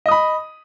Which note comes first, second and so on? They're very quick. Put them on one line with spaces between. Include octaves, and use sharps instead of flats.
D#5 D#6 B5